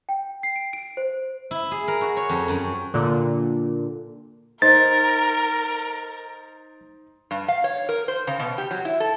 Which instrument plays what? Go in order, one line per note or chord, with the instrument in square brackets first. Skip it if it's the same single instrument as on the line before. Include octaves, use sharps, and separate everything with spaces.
[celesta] G5
C7
D7
D7
C5
[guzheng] E4
G#4
A#4
F#4
C#5
F2
F#2
[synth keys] A#2 D3
[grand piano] D#4 C5 [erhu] A#4 [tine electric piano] A6
[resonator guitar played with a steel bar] G2
F5
C#5
A#4
C5
C#3
B2
G4
F#3
E4
A4